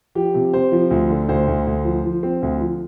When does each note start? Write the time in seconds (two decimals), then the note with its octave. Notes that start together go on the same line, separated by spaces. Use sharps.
0.15 F3 G4
0.34 C3
0.54 C3 C5
0.72 F3
0.91 D2
1.10 D3
1.29 D2 C5
1.47 D2
1.67 D2
1.85 F3
2.04 F3
2.23 C4
2.42 D2
2.61 F3